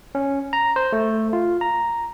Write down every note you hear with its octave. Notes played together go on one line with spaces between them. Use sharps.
C#4
A#5
C5
A3
F4
A#5